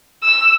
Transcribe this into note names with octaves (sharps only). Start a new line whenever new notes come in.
E6